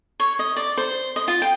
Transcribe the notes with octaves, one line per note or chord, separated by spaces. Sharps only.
C#5
D#5
D5
C5
D#5
F4
G5